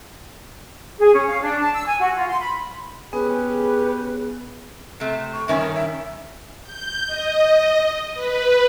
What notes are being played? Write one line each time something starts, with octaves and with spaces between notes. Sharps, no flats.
G#4
C#4
F5
D4
A5
E6
G#5
F#4
F4
C6
B5
B3 C#4 G4 G#4 B4
C3 A3
C#6
G2 D#3 C#4 E5
A#4
E5
G6
D#5
B4